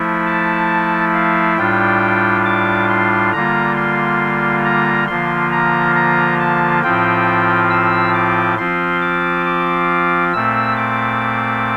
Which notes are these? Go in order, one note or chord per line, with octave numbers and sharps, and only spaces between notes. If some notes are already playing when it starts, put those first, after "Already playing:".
Already playing: F3 A3 E4
A5
F5
A2 G3 D4 F4 G5
D6
C6
D3 G3 A#3 F4 A#5
C6
A#5
D3 F3 A#3 F4 C6
A#5
A#5
A5
A2 F3 C4 F4 G5
E6
D6
F3 C4 F4 C6
D6
D6
A#2 A3 C4 E6
D6